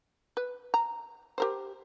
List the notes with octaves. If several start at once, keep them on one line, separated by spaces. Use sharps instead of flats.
B4
A#5
G4 A#4 C5